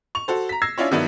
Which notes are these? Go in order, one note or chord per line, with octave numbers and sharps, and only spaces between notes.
C#6 F7
F#4 A4 C5
A#5 B6
E6 G#6 A#6 C7
C#4 D4 E4 F4 C#5
G2 D#3 F#3 B3 D4 E4